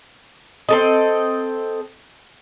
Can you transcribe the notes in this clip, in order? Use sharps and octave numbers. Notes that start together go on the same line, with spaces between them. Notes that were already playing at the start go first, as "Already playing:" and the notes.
C4 A4 D#5